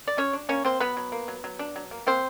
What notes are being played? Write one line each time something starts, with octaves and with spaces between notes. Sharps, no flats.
D5
F#3 C#4 C#5
D4
A#3 C#4 C#5
A#3 C4 C5
F#3 B3 B4
F#3
A#3
F#3
F#3
D4
F#3
A#3
A#3 C4 C5